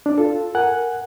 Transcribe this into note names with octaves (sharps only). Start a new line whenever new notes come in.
D4
F4 A4
A#4 F#5 G#5 F#6